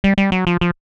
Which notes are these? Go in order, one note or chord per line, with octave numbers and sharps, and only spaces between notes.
G3
G3
F#3
F3
F3